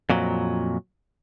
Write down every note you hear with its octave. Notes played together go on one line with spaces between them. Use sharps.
F2 A#2 F#3